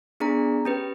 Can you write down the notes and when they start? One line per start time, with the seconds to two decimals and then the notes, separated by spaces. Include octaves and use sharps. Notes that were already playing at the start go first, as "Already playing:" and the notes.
0.20 B3 D4 G#4 D5 A#5
0.65 C#4 G4 B4